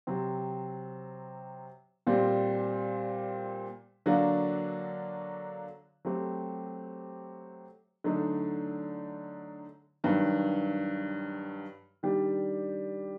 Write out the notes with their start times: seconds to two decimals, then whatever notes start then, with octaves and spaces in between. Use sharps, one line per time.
0.07 C3 F#3 C4
2.07 A#2 G3 C4 G4
4.06 D3 F#3 A#3 D4 F#4
6.05 F#3 A3 C4 G4
8.04 D3 F#3 A3 D#4
10.04 G2 D#3 F#3
12.03 D#3 G3 D4 G4